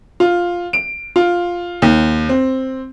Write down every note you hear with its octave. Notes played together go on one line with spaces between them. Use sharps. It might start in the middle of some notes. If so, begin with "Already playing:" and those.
F4
D7
F4
D#2
C4